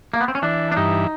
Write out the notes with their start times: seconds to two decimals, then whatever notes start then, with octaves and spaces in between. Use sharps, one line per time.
0.14 A#3
0.21 B3
0.28 C4
0.35 C#4
0.42 E3 D4
0.72 D4
0.77 G2 D#4